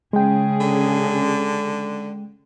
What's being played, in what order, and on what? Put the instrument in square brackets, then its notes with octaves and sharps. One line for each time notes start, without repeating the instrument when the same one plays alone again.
[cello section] C#3 G#4 [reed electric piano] G#3 G5
[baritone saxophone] D3